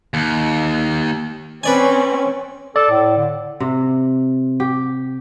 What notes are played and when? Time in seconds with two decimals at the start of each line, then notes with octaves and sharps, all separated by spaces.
0.14 D#2
1.63 C4 C#4 B4 D5 G#5
2.76 A4 D5
2.90 A2
3.17 D3
3.60 C3
4.60 G4